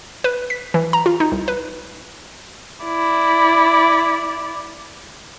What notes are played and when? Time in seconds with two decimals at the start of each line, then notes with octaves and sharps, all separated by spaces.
0.24 B4
0.50 B6
0.74 E3
0.93 A#5
1.06 F4
1.20 D#4
1.32 C2
1.48 B4
2.85 E4 D5